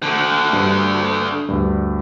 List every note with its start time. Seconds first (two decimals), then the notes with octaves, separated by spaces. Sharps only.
0.03 D3 F#4
0.53 G2
1.49 D2 G2